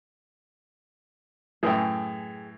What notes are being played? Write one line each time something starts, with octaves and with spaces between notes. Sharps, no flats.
F#2 A2 E3 G#4 G5